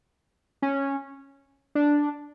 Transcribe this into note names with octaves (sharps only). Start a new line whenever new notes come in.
C#4
D4